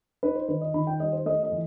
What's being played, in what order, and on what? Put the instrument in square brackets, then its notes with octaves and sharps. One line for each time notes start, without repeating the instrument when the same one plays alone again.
[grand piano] D#4 B4
C5
D#3 B4
D#5
D#3 B5
G5
G3 D#5
C5
A3 D#5
D#5
E3